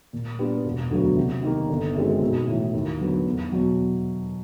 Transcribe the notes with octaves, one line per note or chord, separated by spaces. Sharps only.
A#2
G3 B3 D4 F4
E1
D2 D3 F#3 B3
C3
D#3 G3 A#3
G1
F#2 D#3 G#3 C4
B1
A2 E3
D#2
D3 F#3 B3
E2
B2 F#3